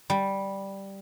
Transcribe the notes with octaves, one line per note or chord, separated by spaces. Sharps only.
G3